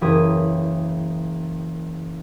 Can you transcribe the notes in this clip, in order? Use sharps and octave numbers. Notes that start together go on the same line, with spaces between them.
F#1 E3 G4 B5 D#6 G#6